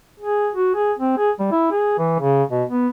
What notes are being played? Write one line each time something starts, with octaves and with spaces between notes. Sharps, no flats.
G#4
F#4
G#4
C4
G#4
G3
E4
G#4
E3
C#3
B2
B3